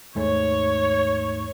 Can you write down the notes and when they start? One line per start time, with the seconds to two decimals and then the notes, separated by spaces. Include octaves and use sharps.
0.15 D#2 G#2 A3 C#5